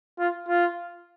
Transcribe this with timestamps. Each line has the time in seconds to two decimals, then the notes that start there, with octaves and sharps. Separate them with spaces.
0.19 F4
0.48 F4